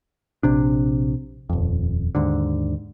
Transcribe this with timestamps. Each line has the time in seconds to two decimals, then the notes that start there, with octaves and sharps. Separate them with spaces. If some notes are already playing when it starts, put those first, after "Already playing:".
0.43 A#1 C3 D4
1.50 D#1 F2
2.15 D#2 G#2 D3